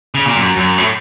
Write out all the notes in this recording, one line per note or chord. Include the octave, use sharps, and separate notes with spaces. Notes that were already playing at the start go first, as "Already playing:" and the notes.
C#3
A#2
F#2
F#2
A2